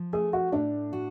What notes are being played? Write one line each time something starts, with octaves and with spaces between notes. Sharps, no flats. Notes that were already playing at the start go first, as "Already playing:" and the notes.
Already playing: F3
A3 G#4
F#4
A2 D4
F#4